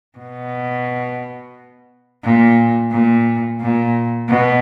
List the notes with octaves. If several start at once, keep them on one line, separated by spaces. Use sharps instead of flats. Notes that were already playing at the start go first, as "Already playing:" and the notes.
B2
A#2
A#2
A#2
B2